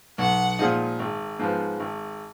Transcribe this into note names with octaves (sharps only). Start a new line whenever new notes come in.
B1 F#5
A#2 F3 G#3 D#4
G#1
G#2 F3 B3
G#1